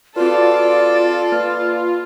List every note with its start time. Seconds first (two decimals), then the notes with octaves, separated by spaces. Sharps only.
0.16 C4 F4 F#4 A4 B4 D5
1.32 A#3 B4 F6